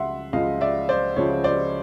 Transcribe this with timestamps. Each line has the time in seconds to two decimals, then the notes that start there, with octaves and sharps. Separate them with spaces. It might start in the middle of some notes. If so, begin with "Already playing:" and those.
Already playing: C#2 C#3 F3 E5 F#5 C6
0.33 C#2 C#3 F3 D#5 F5
0.61 D5 E5
0.89 C5 D5
1.16 C#2 C#3 F3 C#5
1.44 C5 D5